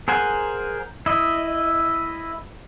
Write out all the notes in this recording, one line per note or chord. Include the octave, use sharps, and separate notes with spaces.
G#4 A#4 C5 F#5 G#5
E4 D#5